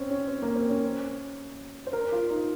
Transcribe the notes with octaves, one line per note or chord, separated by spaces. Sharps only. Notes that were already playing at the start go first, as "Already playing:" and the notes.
Already playing: C4 C#4
C#4
C4
A#3
C4
C#4
C5
A#4
F4
D#4